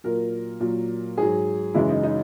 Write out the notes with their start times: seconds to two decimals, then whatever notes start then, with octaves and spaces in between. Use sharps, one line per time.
0.04 A#2 F#3 A#4
0.60 A#2 F#3
1.18 G#2 F#3 G#4
1.74 F#2 C#3 E3 G#3 E4
1.89 D#4
2.03 D#4